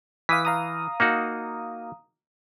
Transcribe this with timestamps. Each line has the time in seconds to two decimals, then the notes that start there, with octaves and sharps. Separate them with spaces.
0.29 E3 F5 D#6 B6
0.45 F5 A#5 D#6
1.00 A#3 D#4 F#4